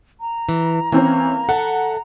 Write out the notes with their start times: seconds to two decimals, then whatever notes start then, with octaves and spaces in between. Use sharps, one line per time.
0.20 A#5
0.49 E3
0.92 E3 A#3 C4 C#4
1.49 A4 E5 F#5